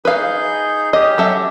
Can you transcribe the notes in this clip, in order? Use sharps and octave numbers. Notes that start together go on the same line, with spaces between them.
D#4 G#4 B4 F5 G6
C#4 G4 D#5
F#3 A4 E5